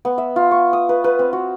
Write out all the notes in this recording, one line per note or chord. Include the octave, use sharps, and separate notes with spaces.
B3
E5
F4
C#6
D#6
B4
B4
C4
F#4